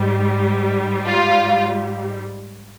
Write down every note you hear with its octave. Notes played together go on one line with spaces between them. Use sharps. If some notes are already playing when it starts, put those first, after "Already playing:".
Already playing: G#2 G3
F4